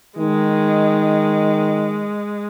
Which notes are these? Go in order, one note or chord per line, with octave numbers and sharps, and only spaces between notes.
D#3 G#3